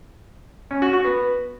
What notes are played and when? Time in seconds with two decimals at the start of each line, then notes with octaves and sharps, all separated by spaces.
0.71 C#4
0.82 F#4
0.93 F#4
1.05 B3